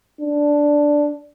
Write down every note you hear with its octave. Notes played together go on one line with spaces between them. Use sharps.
D4